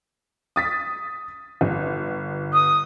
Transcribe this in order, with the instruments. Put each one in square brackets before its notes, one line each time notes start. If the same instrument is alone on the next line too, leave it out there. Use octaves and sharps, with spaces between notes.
[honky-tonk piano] D#6 A6 B6
G1
[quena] D#6